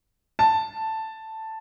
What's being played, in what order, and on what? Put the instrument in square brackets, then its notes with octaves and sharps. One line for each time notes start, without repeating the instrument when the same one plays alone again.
[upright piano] A5